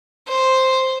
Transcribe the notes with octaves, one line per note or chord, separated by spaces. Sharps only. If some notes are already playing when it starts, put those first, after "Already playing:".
C5